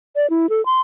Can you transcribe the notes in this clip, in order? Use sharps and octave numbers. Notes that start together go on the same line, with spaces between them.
D5
E4
A4
C6